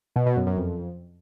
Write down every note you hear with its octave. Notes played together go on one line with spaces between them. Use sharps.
B2
B2
F#2
F#2
F2